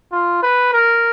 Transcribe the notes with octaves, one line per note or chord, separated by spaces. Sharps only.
F4
B4
A#4